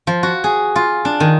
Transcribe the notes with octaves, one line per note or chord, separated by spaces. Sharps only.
F3
F#4
G#4
F4
D4
D#3